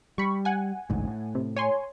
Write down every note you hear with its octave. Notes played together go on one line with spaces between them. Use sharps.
G3 B5 C#6
F#5 G#5
A1 D2 G#2
A2
C3
C#5 G#5 C6